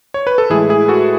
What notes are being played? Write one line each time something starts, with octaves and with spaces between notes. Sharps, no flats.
C#5
B4
A4
A2 E3 G#3 E4 G#4
E4 G#4
F#4 A4